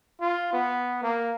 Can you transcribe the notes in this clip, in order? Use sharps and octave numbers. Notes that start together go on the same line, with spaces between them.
F4
B3
A#3